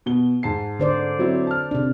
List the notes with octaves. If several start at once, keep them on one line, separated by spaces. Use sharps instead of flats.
B2 B3 G7
G#2 A5 C7
D3 C5 D5
F#3 C4 E4
A5 F6
C3 D4